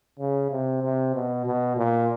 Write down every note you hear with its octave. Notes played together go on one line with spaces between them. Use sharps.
C#3
C3
C3
B2
B2
A#2